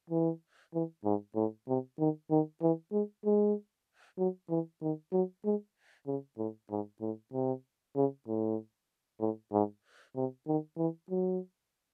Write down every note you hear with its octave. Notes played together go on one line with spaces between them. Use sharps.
E3
E3
G#2
A2
C3
D#3
D#3
E3
G#3
G#3
F#3
E3
D#3
F#3
G#3
C#3
A2
G#2
A2
C3
C#3
A2
A2
G#2
C3
D#3
E3
F#3